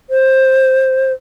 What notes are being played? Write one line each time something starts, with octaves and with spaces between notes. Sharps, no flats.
C5